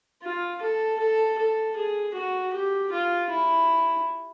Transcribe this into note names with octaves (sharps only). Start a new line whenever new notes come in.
F4
A4
A4
A4
G#4
F#4
G4
F4
E4